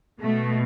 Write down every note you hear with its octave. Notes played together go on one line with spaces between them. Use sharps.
B2 A3